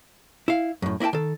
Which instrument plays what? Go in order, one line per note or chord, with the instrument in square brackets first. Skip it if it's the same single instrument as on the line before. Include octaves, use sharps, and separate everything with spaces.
[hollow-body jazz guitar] E4 F5
F#2 A2
A#3 E4 E5 G5 A5
D#3 A4